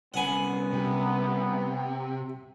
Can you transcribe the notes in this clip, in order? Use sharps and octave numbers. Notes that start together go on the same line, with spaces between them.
C2 B3 C#4 F#5 G#5 B5
C3